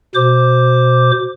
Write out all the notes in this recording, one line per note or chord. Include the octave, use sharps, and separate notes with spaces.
B2 C5 D6